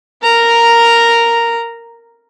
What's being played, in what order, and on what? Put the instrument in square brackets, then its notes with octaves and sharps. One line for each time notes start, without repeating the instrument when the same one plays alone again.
[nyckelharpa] A#4 A#5